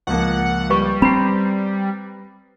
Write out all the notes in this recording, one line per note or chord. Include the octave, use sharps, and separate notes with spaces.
C#2 F3 A#3 F#5
G3 B4 C#6
C4 B4 A#5 B5 C7